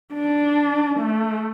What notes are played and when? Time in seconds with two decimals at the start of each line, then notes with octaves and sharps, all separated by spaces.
0.14 D4
1.00 A3